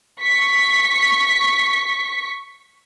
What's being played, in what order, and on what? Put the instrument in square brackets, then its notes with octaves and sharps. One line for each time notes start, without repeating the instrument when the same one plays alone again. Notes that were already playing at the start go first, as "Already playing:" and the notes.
[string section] C#6 B6